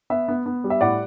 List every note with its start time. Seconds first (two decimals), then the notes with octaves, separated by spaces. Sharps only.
0.10 B3 E5
0.28 B3
0.46 B3
0.64 G3
0.70 E5
0.81 A2 D5 F#5